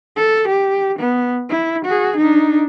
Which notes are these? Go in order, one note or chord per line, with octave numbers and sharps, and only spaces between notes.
A4
G4
B3
E4
F#4 G#4
D4 D#4